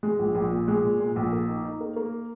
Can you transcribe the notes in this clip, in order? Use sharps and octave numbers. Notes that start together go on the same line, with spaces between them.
G#3
A#1
A#1
A#2
G#3
A#2
A#2
A#1
A#3
D#4
D#4
A#3
A#3